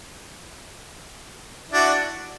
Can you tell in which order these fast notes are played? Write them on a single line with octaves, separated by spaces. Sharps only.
E4 D4 F#4